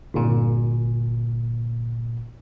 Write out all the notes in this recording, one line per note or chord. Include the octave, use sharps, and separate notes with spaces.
G1 A#2